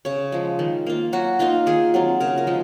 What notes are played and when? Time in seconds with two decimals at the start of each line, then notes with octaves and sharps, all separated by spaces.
0.05 C#3 C#5
0.32 F3 G#3
0.59 D#3
0.87 A#3 F4
1.13 F#3 F#4
1.39 A#3 D#4 F4
1.66 D#3 G#4
1.94 F#3 C4 F4
2.20 C#3 A#4
2.38 A#4
2.47 F3 G#3 D#4